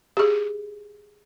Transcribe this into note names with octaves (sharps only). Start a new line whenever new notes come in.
G4 G#4